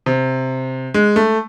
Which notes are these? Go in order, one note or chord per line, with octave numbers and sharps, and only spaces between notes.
C3
G#3
A3